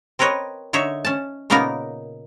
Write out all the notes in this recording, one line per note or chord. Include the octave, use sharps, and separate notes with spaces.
C4 A#4 B4 C#5 D#5
D3 D#4 C#5 E5
C#4 A5
A#2 C#3 A#3 B3 D#4 A#4